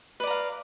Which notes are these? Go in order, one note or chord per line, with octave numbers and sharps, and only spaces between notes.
B4 D5 F5 A#5